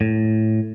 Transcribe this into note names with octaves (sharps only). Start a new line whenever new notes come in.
A2